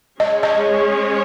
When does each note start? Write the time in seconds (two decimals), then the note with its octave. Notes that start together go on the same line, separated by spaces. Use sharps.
0.20 G#3 C#4 G#4 C#5 D#5
0.43 D#5